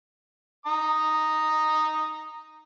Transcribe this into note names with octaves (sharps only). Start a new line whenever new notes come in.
A#5 D#6